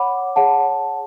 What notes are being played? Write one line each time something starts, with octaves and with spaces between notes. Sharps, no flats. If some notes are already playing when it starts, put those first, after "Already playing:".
Already playing: C#5 F#5 B5 D6
G#4 C#5 F#5 A5